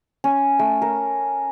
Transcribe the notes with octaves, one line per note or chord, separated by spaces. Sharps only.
C#4
A3
A#4